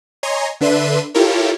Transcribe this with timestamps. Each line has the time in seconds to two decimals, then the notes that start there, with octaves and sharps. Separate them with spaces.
0.23 C#5 D#5 G#5 A#5 C6
0.61 D3 D4 B4 E5 C6 D#7
1.14 E4 F4 G4 A4 A#4 C#5